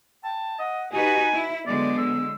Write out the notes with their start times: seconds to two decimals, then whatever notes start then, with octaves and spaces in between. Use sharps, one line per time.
0.24 G5 A5
0.59 D#5 F#5
0.93 D#4 F#4 G4 B4 G#5
1.33 E4 E5
1.67 D3 F#3 G#3 B3 D5
1.98 E6